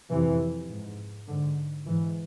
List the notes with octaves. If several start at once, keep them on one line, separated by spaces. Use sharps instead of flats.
F2 C3 E3
G#2
G#2 D3
G#2 E3